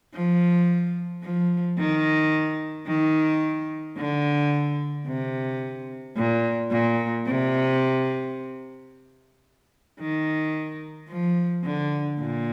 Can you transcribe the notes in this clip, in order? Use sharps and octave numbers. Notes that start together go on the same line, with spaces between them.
F3
F3
D#3
D#3
D3
C3
A#2
A#2
C3
D#3
F3
D3
A#2